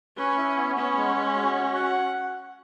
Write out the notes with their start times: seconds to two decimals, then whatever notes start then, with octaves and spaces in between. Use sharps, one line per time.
0.17 C#4 B4
0.37 E4
0.57 B3
0.76 B3 C#4
0.96 G#3
1.16 G#3
1.36 F#4
1.56 F#4
1.75 F#5